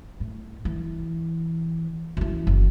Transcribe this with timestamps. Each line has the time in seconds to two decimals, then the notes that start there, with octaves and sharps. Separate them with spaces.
0.20 A2
0.65 E3
2.17 F#2 E3
2.47 F#1